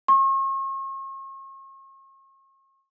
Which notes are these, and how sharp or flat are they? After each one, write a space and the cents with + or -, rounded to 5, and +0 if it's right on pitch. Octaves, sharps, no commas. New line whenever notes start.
C#6 -40